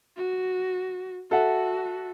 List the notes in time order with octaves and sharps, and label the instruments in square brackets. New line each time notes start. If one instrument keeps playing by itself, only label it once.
[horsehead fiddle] F#4
[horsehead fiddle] F#4 [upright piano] A4 E5 F#5